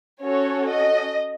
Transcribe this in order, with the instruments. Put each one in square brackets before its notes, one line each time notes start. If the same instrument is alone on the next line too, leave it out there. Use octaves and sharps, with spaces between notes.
[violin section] C#4 F#4 A4 C#5
D#5